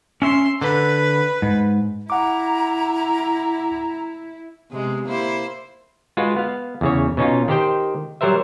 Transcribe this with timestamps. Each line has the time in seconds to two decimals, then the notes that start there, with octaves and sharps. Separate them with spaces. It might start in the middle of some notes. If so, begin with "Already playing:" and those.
0.22 C#4 E5 C6
0.61 D3 B4
1.42 G#2
2.10 E4 F#5 A#5 D6
4.70 C3 G#3 B3
5.06 A#3 E4 C5
6.17 G#3 F4 F#4 B4
6.36 B3 F5
6.81 E2 C#3 C#5
7.17 B2 C#4 D#4 F4
7.48 D#3 G4 C5 G5
8.21 F#3 G3 A#4 C5 E5